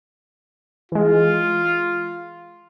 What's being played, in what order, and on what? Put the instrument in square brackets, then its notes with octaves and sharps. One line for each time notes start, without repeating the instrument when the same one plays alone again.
[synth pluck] E3 G#3 [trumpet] F4